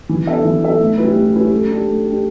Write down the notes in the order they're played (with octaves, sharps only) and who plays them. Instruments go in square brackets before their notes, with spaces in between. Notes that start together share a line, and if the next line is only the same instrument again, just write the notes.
[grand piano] E3
B3 D4 A4 E5
E3
B3 D4 A4 E5
A2
G3 C#4 E4 B4
A2
G3 C#4 E4 B4
A3
D4 G4
A3
D4 G4